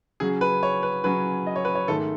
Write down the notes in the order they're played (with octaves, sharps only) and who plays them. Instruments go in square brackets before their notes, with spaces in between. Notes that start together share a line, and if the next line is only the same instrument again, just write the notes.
[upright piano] C#3 F#3 C#4 [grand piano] G#4
[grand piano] B4
C#5
B4
[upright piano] C#3 F#3 C#4 [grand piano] B4
[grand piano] D#5
C#5
B4
C#5
[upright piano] G#2 D#3 A3 [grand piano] A4